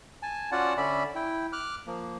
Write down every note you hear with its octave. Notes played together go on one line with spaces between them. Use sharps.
G#5 A5
C#4 F4 F#4 D5 F#5 A5
D3 C#4 D5 E5 B5
E4 G5
D6 F6 F#6
F3 A#3